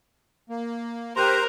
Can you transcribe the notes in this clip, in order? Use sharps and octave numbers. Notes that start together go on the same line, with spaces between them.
A#3
G4 A#4 C5 A#5 C6 F#6 D#7